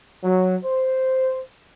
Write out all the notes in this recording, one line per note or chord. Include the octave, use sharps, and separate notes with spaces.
F#3
C5